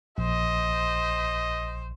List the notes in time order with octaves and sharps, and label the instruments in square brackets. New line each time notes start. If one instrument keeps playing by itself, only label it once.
[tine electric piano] A#1 [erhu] C5 [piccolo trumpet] D#5